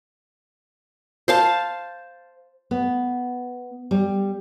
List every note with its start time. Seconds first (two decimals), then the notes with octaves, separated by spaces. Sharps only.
1.28 C5 F5 A5
2.71 B3
3.91 G3